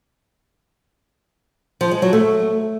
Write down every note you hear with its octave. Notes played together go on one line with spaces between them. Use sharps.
F3
G#3
F#3
A3